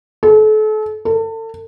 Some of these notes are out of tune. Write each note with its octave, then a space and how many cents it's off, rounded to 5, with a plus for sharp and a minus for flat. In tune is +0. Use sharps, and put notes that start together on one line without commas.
A4 -35
A4 +35